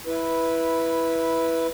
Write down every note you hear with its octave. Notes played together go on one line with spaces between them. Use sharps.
E4 B4